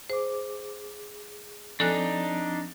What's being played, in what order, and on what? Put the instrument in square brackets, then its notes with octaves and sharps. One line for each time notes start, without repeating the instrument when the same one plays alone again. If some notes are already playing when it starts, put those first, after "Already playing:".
[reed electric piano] G#4 D6 [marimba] C5
[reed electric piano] F3 C4 [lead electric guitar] D4 D#4 [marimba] A4 G#5 F#6